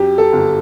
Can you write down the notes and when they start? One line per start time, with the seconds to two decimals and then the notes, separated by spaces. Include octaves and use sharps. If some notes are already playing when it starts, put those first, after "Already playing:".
Already playing: F#2 G4
0.18 A4
0.33 G1